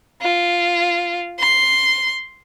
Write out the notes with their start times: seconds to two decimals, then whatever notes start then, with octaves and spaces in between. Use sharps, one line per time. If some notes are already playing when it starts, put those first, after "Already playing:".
0.22 F4
1.40 C6